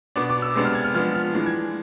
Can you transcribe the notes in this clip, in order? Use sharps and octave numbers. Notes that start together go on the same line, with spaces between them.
B2 B3 D4 D6
D6
E6
C3 G#3 B3 D4
F6
G#6
F6
F3 G#3 B3 D4 F6
F6
E3 G#3 D4
G#6